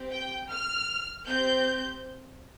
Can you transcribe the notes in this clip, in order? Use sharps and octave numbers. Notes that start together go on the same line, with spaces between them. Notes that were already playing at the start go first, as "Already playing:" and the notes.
Already playing: C4 G4
G5
F6
C4 G4 G6